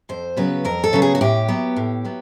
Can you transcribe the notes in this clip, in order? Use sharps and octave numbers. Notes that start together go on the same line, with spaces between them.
F2 C5
C#3 F#3 B3 B4
F2 A#4
A4
C#3 F#3 B3
G#4
F#4
A2 G4
F#3 B3
A2
F#3 B3